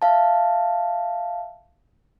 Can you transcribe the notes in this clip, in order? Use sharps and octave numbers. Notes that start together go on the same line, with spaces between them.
E5 F5 A5